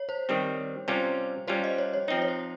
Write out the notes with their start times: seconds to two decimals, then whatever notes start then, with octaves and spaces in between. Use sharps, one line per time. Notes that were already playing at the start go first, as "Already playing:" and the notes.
Already playing: C#5
0.09 C5
0.29 D#3 G3 C4
0.88 C3 G3 C#4 F4 C5
1.48 G3 C#4 F4 C5
1.64 D#5
1.78 C#5
1.94 C#5
2.08 F3 C4 D#4 C#5
2.22 C#5
2.28 C5